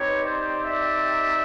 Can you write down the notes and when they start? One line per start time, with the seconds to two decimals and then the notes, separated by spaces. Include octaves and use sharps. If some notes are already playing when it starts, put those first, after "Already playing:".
Already playing: C4 D#4 G4 B4 C#5
0.24 C5 D5
0.64 D5 E5